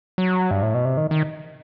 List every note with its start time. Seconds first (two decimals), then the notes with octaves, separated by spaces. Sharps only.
0.18 F#3
0.51 G2
0.62 A2
0.74 B2
0.85 C3
0.97 D#3
1.11 D#3